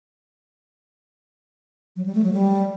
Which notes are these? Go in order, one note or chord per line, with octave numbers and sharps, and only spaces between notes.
F#3
G3
A3
F#3
G3